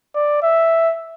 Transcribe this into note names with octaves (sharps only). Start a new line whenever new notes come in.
D5
E5